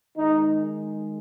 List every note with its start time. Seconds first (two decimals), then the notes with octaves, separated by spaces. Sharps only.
0.18 D#3 G#3 D#4